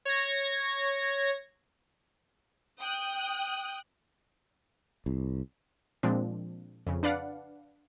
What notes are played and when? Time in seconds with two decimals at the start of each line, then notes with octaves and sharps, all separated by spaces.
0.05 C#5 G#6 A#6
2.80 G5 D#6 F#6
5.06 C2
6.03 A#2 F3 G#3 C4 D4
6.87 F2 C#3
7.03 D4 B4 D5 F5 F#5